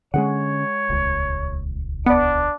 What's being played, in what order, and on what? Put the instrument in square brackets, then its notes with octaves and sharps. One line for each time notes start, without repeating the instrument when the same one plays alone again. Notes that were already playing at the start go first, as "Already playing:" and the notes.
[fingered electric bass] D3 C4 C#4 [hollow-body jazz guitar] G#3 G#4 F#5 [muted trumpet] C#5
[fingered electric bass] D#1 C#2
[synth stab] B3 [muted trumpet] D4 [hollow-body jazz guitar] D5 F#5